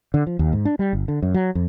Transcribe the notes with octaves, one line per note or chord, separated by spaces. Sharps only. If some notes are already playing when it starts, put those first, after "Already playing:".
D3
F3
D#2
G#2
D4
G3
G1
D3
F#2
F#3
F2